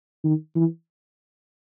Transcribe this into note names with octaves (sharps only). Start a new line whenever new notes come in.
D#3
E3